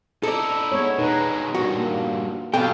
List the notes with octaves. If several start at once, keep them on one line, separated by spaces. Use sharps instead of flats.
D#4 E4 A4 D5
G#3 B3 C#5
B2 G#3 D#4 B4
G2 A#2 F#4
A#3
B1 B2 B3 G4 A4 F5 G5